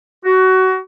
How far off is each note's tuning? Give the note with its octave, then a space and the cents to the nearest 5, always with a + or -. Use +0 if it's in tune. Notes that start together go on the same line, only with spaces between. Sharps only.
F#4 +20